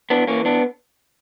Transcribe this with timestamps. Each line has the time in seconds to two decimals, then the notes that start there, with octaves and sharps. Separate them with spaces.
0.10 E3 B3 D4
0.27 E3 A#3 C#4
0.45 B3 D4